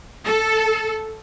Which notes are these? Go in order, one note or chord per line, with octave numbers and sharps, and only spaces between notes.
A4